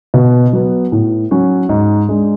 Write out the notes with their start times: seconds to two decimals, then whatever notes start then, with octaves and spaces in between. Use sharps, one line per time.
0.14 B2
0.53 F#3 B3
0.92 A2
1.31 F#3 C#4 F#4
1.69 G#2
2.09 G#3 D4